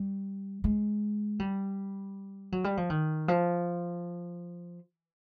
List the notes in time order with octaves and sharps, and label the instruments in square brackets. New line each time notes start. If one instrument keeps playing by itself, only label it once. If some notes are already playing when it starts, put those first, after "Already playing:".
Already playing: [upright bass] G3
G#3
G3
F#3
G3
F3
D#3
F3